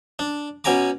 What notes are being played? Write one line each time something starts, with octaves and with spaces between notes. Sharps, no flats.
D4
B2 C#4 G#5 A#5 D6